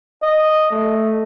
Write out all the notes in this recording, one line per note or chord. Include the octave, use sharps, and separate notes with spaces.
D#5
A3